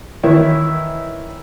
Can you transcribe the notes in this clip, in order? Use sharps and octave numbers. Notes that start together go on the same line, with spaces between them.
D#3 E3 E4 C#5